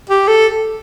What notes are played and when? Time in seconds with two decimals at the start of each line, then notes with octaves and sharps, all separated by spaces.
0.09 G4
0.28 A4